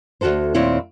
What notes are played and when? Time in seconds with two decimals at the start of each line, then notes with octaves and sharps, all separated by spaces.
0.21 D2 A#2 F#4 A4 C5
0.54 D#2 A#2 C4 E4 C#5